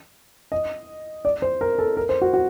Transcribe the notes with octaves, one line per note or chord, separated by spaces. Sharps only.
D#5
D5
C5
A#4
A4
A#4
C5
F#4
F#4